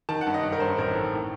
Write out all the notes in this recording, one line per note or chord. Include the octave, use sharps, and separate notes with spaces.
D#3 A5
F#5
G2
D#5
G2
A#4
G2 C5
A1 A#4
D#3 A4
A2